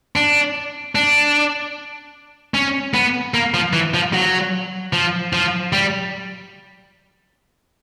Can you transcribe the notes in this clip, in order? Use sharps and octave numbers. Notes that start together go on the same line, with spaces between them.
D4
D4
C#4
B3
A#3
F3
E3
F3
F#3
F3
F3
G3